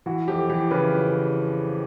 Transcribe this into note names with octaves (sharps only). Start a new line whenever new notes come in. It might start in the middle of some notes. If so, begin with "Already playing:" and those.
E3 F#4
F2 G4
E3 G4
C#3 B4
F2